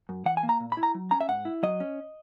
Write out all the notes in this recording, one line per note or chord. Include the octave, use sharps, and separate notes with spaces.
F#2
E3 F#5
G#5
A#3
A#5
A#2
B5
E4
A#5
F#3
C#4 A#5
E5
G#2 F#5
E4
F#3 D#5
C#4